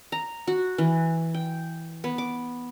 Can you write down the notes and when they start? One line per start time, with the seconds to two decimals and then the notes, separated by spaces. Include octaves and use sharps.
0.12 A#5
0.47 F#4
0.78 E3
1.34 G5
2.04 B3
2.18 D6